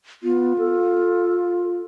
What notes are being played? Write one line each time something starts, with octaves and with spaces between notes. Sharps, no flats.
B3 F4
A4